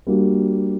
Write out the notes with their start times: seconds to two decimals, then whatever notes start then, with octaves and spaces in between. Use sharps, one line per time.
0.07 G3 A#3 D4 F#4